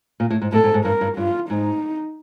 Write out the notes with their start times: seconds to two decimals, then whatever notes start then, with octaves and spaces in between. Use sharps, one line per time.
0.20 A#2
0.30 A2
0.42 G#2
0.52 A2 A4
0.64 G#2
0.74 G#2
0.85 G2 A#4
1.01 G2
1.17 G2 F4
1.49 G#2 D#4